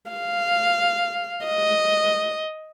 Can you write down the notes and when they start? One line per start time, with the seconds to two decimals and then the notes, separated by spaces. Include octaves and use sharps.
0.11 F5
1.46 D#5